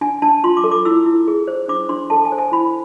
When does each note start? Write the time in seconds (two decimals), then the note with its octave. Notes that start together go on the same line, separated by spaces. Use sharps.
0.01 D4 G#5
0.22 D4 A5
0.44 F4 C6
0.57 D6
0.64 A4
0.72 D6
0.85 E4 E6
1.06 E4
1.28 G#4
1.48 C5
1.68 D4 D6
1.89 D4 C6
2.10 A4 A5
2.25 G#5
2.32 C5
2.38 G#5
2.52 E4 B5